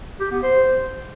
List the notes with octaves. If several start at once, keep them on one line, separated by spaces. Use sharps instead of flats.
G4
B3
C5